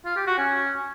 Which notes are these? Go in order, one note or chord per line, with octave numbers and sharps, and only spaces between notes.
F4
G4
F#4
C#4